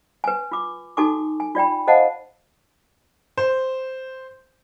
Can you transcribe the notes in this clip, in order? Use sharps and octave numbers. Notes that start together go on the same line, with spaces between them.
B4 G#5
F4 D6
D#4 F#4 A4 G#5 C#6 D6
G#5
F4 D5 G5 B5
A4 C5 D#5 F5 F#5 A5
C5